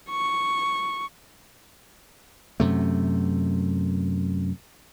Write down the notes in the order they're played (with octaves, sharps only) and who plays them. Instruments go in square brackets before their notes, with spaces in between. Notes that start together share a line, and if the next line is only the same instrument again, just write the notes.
[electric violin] C#6
[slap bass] F#2 C3 A3